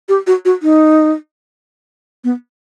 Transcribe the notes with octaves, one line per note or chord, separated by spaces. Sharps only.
G4
F#4
F#4
D#4
B3